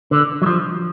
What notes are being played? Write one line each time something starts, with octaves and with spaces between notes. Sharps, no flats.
D3
F#3
F3